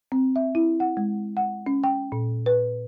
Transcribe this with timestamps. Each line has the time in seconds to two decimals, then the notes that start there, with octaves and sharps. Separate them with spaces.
0.12 C4
0.36 E5
0.55 E4
0.80 F#5
0.97 G#3
1.37 F#5
1.66 C#4
1.84 G5
2.12 A#2
2.46 B4